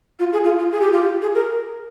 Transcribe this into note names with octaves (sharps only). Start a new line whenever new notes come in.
F4
G#4
F4
F4
G#4
G4
F4
G4
G#4
A#4